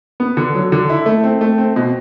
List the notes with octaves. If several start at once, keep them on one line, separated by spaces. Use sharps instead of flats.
B3
D3
F#3
D3
E4
A3
C4
A3
C4
B2